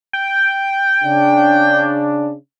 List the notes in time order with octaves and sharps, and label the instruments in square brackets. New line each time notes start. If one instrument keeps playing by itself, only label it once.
[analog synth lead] G5
[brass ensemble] C#3 D4